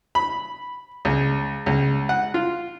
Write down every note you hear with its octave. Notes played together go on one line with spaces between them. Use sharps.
B5
C#2
C#2
F#5
F4